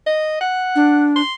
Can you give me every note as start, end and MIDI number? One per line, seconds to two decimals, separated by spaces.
0.07 0.36 75
0.41 1.08 78
0.76 1.21 62
1.16 1.35 84